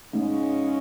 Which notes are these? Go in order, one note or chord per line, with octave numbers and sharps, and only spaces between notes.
G#2 C#3 G#3 C#4